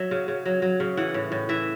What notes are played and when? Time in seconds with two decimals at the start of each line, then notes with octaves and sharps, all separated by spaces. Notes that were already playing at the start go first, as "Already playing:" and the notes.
Already playing: F#3 E5
0.11 C#3
0.28 C#3
0.46 F#3
0.62 F#3
0.80 C#3
0.97 E3 F#5
1.14 A2
1.32 A2
1.49 E3 E5